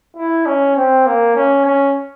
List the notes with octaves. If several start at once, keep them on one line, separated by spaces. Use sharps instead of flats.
E4
C#4
C4
A#3
C#4
C#4